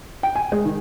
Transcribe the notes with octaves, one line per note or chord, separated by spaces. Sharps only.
G5
G#5
G#3
D#3